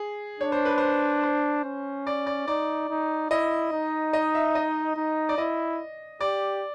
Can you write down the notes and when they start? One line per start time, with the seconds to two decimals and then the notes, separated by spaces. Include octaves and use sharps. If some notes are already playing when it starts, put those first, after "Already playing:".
Already playing: G#4
0.40 D4 C#5
0.52 C5
0.65 B4
0.78 C5
1.23 C5
1.64 C#4
2.07 D5
2.26 D5
2.47 D#4 D5
2.89 D#4
3.30 E4 D#5
3.72 D#4
4.13 D#5
4.35 E5
4.55 D#5
4.96 D#4
5.29 D5
5.38 E4 D#5
6.21 G4 D5